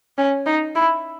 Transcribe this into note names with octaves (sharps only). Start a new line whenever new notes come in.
C#4
D#4
E4